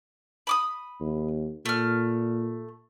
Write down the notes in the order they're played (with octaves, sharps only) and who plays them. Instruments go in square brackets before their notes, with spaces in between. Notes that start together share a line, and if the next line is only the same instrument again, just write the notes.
[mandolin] B5 D6 D#6
[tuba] D#2
[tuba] A#2 [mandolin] A3 F6